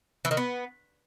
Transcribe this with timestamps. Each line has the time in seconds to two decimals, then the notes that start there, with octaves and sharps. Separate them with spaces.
0.25 E3
0.31 D#3
0.37 B3